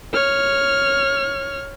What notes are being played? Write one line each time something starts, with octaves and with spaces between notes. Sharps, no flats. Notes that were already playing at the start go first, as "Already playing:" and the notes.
C#5 F6